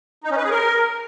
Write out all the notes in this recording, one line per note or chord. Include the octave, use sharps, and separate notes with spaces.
D#4
C#4
B4
G#4
A#4